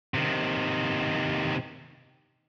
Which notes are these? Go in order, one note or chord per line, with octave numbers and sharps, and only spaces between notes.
C3 D#3